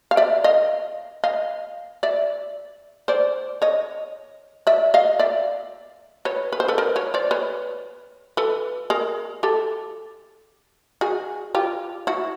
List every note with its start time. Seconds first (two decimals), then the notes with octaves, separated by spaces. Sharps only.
0.11 F5
0.17 D5 E5
0.44 D#5 F5
1.24 D#5 F5
2.03 D5 E5
3.08 C5 D5
3.62 C#5 D#5
4.67 D5 E5
4.94 D#5 F5
5.19 D5 E5
6.25 B4 C#5
6.52 B4
6.60 C5
6.68 A4 B4
6.78 A#4 C5
6.96 B4 C#5
7.14 C5 D5
7.31 B4 C#5
8.37 A4 B4
8.90 G#4 A#4
9.43 G4 A4
11.01 F#4 G#4
11.55 F4 G4
12.07 E4 F#4